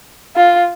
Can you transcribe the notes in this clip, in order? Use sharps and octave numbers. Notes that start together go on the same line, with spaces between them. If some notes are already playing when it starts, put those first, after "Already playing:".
F4